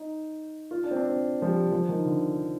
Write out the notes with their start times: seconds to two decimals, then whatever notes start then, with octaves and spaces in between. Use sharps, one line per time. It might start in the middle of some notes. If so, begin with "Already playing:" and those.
Already playing: D#4
0.71 F4
0.84 D4
0.91 C4
0.96 D4
1.09 C4
1.42 F3
1.46 G3
1.72 F3
1.89 D#3
2.05 D3